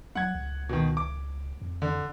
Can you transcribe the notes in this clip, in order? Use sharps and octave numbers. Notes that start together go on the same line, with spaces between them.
F#3 F#5 G#6
C#2
B2 D#3
D6
F2
D3